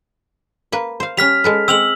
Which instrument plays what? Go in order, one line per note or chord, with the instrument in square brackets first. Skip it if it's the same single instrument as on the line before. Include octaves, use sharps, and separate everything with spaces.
[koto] A#3 B4
C5 F5
[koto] G3 C#4 [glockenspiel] F6 B6 F7
[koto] G#3 A4 B4
[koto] G#3 C4 [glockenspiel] E6 F7 F#7